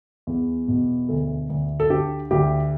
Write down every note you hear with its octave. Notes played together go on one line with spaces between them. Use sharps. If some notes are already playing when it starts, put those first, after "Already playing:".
E2
B2
D2 A4
D2
A4
D3 G4
D2 G4